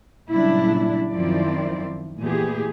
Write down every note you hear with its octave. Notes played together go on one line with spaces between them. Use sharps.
A#2 C#3 F#3 G3 D4 E4
F#2 D#3 F3 C4 E4 D5
A#2 E3 A3 B3 G4 G#4